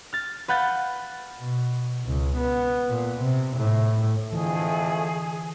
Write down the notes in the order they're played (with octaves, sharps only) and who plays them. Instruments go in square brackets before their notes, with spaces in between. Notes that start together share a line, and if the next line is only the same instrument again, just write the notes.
[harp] F6 A6
B4 F5 F#5 G6 A6
[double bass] B2
C#2
B3
A#2
C3
A2
[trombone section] F2 A3 [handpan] D3 E3 [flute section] G#4